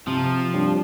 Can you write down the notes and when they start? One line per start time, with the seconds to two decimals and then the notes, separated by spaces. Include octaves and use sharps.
0.07 C3 F3
0.54 G3 D4